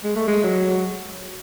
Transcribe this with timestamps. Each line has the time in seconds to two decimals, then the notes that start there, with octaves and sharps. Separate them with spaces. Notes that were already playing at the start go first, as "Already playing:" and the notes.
0.04 G#3
0.16 A3
0.28 G#3
0.44 F#3